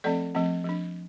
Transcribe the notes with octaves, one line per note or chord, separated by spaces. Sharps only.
F3 A3 C4 A4 D5
F3 A3 C4
F3 D4